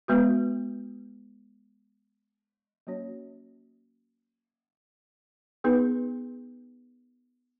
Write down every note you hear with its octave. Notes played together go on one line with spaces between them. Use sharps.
G#3 B3 F#4 B4
F#3 A#3 C#4 F#4 C#5
B3 D#4 G#4 B4